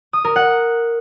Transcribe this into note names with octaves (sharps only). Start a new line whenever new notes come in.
D#6
A#4
F#5